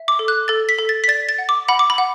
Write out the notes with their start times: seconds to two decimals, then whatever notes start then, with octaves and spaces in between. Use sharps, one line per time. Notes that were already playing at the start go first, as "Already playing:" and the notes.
Already playing: E5
0.08 D6
0.19 A4
0.28 F#6
0.48 A4 A6
0.69 B6
0.78 A4
0.89 A6
1.04 B6
1.08 D5 A6
1.29 A6
1.38 F#5
1.49 D6
1.68 F#5 B5
1.79 D6
1.90 B5
1.98 F#5